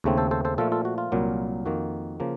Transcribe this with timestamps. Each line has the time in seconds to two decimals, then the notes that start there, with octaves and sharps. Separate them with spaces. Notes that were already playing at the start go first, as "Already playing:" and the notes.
0.04 D#2 C#3 A3 C4
0.17 A4 C5
0.31 A4 C5
0.45 A4 C5
0.58 A#2 F3 A3 F4 A4
0.72 F4 A4
0.85 F#4
0.98 F4
1.12 C2 A#2 F#3 A#3
1.66 F2 D#3 A#3 F#4
2.20 C#3 F3 A#3